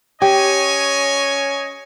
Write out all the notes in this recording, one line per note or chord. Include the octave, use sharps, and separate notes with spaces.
C#4 G4 C#5 D#5 G#5